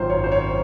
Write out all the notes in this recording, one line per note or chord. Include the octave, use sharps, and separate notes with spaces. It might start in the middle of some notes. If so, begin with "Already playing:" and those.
Already playing: G#1 F#2 D#3 F4 C5
C#5
C5
C#5